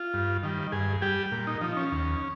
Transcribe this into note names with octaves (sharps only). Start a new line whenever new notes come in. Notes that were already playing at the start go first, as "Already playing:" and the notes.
Already playing: F4
G2
D#3 G3
G2 G#4
G3 G4
A#2
D#4
F3 D#4
C#4
D#2